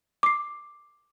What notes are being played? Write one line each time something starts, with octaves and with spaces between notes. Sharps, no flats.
D6 C7